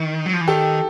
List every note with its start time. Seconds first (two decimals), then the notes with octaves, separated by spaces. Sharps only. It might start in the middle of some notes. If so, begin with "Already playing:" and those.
Already playing: D#3
0.26 F#3
0.33 F3
0.41 E3
0.48 D#3 G4 A4